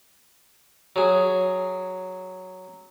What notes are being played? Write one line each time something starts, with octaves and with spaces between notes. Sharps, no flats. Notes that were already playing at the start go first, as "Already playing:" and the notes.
F#3 G#4